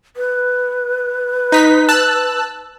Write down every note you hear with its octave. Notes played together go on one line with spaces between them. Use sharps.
B4
D#4 B6
A5 E6 F#6